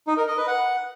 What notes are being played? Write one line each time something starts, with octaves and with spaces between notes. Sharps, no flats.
D#4
A#4
D#5
B4
F#5